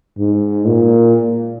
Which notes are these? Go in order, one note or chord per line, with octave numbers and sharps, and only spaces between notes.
G#2
A#2